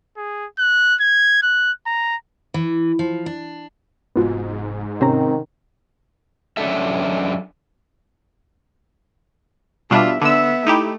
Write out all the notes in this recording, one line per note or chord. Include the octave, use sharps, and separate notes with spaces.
G#4
F#6
G#6
F#6
A#5
E3
F3
D4
F1 G#2 B3 F4 F#4
C3 D#3 C4 C#4 A#5
F#2 F3 D4 A4 E5
B2 G3 D4 F4 E5
D3 B3 E5 E6
A3 D#4 E4 G4